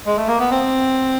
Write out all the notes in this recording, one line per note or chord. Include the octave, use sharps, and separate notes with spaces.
G#3
A3
A#3
B3
C4